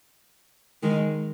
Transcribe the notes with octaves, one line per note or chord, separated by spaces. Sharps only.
D#3 G#3